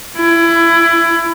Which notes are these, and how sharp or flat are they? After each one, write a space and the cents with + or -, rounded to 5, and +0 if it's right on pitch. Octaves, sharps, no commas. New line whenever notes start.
E4 +25